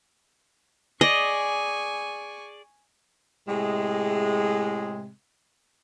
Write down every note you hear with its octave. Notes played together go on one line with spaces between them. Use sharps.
G#4 D5 D#5 G#5 C#6
A2 C3 G#3